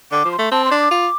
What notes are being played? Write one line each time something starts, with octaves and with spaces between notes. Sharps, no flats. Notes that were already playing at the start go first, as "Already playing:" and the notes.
D3 D6
F3
C6
A3
C4 A5
C6
D4
D6
F4